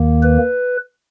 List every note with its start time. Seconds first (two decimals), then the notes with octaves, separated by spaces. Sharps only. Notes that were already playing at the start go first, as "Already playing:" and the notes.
Already playing: D#2 D#3 A#3
0.23 B4